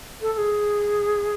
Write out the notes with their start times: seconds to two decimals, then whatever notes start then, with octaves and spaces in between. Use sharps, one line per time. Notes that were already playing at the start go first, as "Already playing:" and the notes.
0.21 A4
0.33 A4
0.38 G#4